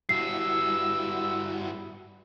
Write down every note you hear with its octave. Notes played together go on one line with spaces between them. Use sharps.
G2 G3 B3 E4 F#4 E6 C7